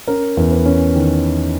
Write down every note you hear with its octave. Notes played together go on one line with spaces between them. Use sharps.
C#4 A#4
E2
B4
C#4
D#3